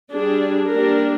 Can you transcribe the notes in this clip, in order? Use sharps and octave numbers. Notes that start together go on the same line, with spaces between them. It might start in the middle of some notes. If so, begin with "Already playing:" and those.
G3 D4 G#4
G3 A#3 D4 A#4